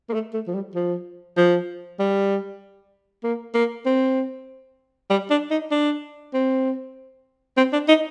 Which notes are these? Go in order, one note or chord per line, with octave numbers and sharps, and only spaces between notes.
A#3
A3
A3
F3
G3
F3
F3
G3
A#3
A#3
C4
G3
D4
D#4
D4
C4
C4
D4
D#4